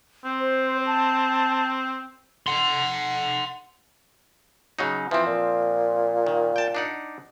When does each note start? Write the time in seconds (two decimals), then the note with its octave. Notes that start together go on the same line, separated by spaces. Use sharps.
0.25 C4
0.40 C5
0.86 A5
2.47 F#5 C6
4.79 C#3 F#3 D#4
5.11 E3 F3 C4
5.26 A#2
6.27 D#3
6.56 G5 A5
6.75 D4 D#4 F#5